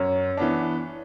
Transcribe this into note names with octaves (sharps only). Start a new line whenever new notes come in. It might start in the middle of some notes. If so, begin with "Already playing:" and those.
Already playing: F#2 C#5
E3 B3 D4